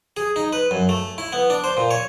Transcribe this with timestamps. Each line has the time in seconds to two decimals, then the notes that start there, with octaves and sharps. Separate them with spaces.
0.17 G#4
0.36 D#4
0.53 B4
0.71 F#2
0.89 A3
1.18 E4
1.33 B3
1.50 D4
1.64 C5
1.77 A#2
1.91 C#5